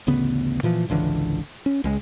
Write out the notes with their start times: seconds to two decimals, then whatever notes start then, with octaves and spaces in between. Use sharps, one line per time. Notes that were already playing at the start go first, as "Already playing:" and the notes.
0.07 A1 D2 C#3 B3
0.63 A#2 E3 F3
0.88 G#1 C#2 D3 E3
1.66 C#4
1.84 C#2 G#3